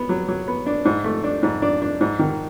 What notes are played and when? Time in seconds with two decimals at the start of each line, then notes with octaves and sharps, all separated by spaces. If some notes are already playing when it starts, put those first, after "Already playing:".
Already playing: B3
0.09 F#3
0.28 F#3
0.48 B3
0.66 D4
0.85 G#2
1.04 A3
1.24 D4
1.43 G#2
1.62 D4
1.82 D4
2.01 G#2
2.19 D#3